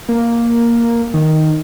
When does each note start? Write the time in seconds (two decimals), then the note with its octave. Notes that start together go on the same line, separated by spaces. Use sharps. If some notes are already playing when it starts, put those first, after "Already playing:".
0.09 A#3
1.14 D#3